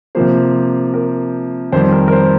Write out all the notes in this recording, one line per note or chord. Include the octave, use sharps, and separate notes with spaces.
C3 F3 A#3 C5
A#4
F2 D#3 G3 C5
A#4
A#4
C5